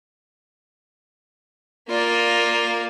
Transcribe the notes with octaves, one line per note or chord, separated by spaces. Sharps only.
A#3 F4 D5